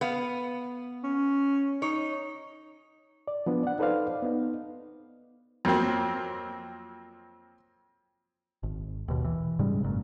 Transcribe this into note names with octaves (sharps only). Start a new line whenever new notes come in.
B3 F5
C#4
D#4 C#5
D5
F3 B3 D4
D5 F#5
D#4 A4 B4 C5 D5 F5
B3 D#4
F2 F#3 A#3 C4
G#1
D#2 B2
E3
G#2 C#3 G3 G#3
G#1 F#2 A#2